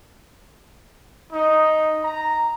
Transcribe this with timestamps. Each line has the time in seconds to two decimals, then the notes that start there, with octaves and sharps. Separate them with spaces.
1.33 D#4
2.04 A#5